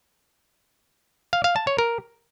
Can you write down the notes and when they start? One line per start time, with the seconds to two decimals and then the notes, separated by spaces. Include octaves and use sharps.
1.33 F5
1.44 F5
1.56 A5
1.67 C#5
1.78 A#4